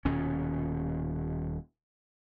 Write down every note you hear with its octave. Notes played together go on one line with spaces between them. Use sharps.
D#1 D#2 B2 C#4